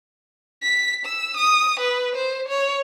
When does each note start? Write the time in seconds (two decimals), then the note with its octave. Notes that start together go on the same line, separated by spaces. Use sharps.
0.63 B6
1.06 E6
1.37 D#6
1.80 B4
2.15 C5
2.49 C#5